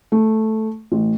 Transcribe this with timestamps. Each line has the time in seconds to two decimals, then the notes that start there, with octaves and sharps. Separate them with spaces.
0.12 A3
0.92 A1